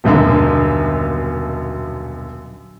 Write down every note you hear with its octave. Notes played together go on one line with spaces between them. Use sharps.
D#1 B1 F#2 D3